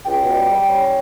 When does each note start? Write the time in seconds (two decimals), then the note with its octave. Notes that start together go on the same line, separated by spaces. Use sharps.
0.06 C#2 G5
0.21 B2
0.36 G3
0.50 G3
0.65 C#4